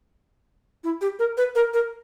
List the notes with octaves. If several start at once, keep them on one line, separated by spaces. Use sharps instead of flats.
E4
G4
A#4
B4
A#4
A#4